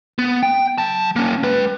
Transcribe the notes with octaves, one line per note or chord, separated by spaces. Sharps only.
B3
G5
F#3 A5
A#3 C#4
G#3 B4